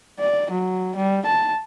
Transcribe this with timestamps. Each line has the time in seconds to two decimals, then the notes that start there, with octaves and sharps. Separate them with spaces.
0.19 D5
0.51 F#3
0.96 G3
1.26 A5